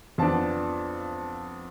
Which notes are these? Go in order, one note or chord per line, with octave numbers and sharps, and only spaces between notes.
F2 F3 B3 D4 A5